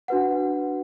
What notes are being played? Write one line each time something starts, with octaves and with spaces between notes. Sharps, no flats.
D4 F#4 B4 F#5